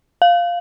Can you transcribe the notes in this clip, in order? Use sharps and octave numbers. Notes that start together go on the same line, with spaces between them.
F5